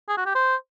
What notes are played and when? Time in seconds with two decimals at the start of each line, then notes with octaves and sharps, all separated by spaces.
0.08 G#4
0.17 F#4
0.26 G4
0.35 C5